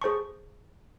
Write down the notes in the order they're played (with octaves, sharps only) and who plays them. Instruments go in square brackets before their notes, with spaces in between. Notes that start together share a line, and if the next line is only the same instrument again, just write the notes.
[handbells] G#4 C5 A5 C#6